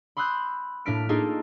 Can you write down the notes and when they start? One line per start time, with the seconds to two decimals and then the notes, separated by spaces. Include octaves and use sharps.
0.17 B5 C6 D#6 E6 F#6 G6
0.85 A2 A#3 D4 F6 B6 D7
1.09 A#3 D4 D#4 F4 G#4 A4